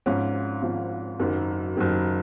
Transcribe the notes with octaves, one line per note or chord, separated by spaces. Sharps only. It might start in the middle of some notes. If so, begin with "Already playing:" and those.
G#1 G#2 F3 C#4
G#1 G#2 F3
F#1 F#2 D#3
F#1 F#2 D#3